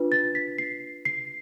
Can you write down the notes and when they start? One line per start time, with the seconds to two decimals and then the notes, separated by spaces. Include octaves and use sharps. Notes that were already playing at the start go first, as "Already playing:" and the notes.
Already playing: D4 F4 B4
0.12 A6
0.35 B6
0.58 C7
1.05 C7